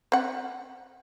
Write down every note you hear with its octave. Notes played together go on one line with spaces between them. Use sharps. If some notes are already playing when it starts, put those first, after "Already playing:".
C4 F#5